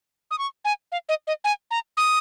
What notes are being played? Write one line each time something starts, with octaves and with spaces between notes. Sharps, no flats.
D#6
C#6
G#5
F5
D#5
D#5
G#5
A#5
D#6